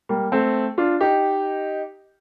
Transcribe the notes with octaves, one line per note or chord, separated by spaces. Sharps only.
G3 A#3
A3 C4
D4 F4
D#4 G4